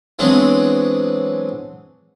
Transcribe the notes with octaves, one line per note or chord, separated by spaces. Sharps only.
E3 F#3 G#3 B3 C4 D4